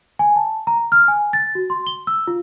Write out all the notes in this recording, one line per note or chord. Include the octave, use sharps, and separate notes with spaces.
G#5
A5
A#5
F6
G#5
A6
F#4
C6
G7
E6
F4